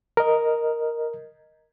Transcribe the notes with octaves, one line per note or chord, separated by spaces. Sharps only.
A#4 D#5